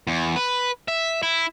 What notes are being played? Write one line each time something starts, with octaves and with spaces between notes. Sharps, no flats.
E2
B4
E5
E4